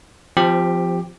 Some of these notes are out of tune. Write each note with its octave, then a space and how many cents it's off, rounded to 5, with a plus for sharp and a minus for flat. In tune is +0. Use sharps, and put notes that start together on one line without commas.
F3 +0 C4 -25 G4 +10